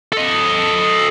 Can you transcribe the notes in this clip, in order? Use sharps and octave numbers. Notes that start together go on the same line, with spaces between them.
A4 D#5